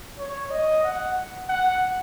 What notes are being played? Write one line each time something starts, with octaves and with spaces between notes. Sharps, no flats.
C#5
D#5
F#5
F#5